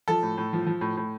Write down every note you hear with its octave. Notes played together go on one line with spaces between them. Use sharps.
F3 A4
A2
A2
F3
F3
A2
A2